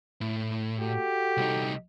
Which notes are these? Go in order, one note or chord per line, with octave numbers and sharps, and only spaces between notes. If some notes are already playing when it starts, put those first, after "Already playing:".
A2
F#4 G4 A4
C2 D#4